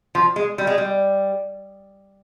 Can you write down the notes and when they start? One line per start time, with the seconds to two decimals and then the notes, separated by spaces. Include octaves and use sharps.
0.15 F3
0.36 G#3
0.58 G3
0.67 G#3
0.78 G3